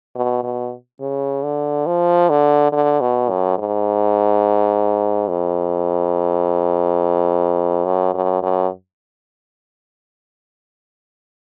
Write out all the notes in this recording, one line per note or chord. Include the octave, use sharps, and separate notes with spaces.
B2
B2
C#3
D3
F3
D3
D3
B2
F#2
G#2
F2
F#2
F#2
F#2